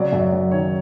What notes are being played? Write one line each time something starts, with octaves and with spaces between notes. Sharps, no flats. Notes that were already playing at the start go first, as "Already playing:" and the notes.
Already playing: C#3 F#3 D5
F#2
F#3
D#3 C#5